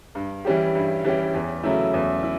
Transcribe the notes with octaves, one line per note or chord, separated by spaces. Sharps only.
G2
E3 G3 C#4 G4
G2
E3 G3 C#4 G4
E2
C#3 F#3 A3 E4
E2
E4